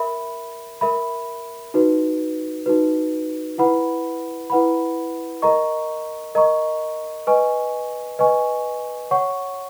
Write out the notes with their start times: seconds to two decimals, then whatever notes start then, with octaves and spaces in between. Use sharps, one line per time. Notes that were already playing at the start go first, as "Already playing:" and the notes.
Already playing: A#4 E5 B5
0.81 A#4 E5 B5
1.74 D#4 F#4 B4
2.66 D#4 F#4 B4
3.58 E4 B4 F#5 B5
4.50 E4 B4 F#5 B5
5.42 A#4 D#5 A#5 C#6
6.35 A#4 D#5 A#5 C#6
7.27 B4 D#5 G#5 C#6
8.19 B4 D#5 G#5 C#6
9.11 C#5 F#5 C#6